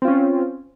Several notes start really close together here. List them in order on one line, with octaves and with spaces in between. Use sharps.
C4 F4 C#4